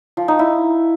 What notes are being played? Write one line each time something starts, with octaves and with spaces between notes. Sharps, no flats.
F3
D#4
E4